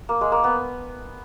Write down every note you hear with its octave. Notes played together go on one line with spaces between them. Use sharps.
A#3
G#3
A#3
B3